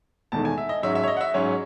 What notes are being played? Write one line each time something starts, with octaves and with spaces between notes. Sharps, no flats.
E1 E2 D#3 A3 A5
G#5
E5
D#5
G#2 F#3 C#4 E5
E5
C#5
D#5
F#5
E5
G#2 F#3 C#4 C#5